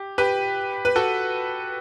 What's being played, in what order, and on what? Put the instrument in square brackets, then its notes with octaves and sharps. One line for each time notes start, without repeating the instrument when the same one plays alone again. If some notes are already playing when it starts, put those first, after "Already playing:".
Already playing: [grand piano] G4
G4 B4
B4
F#4 A4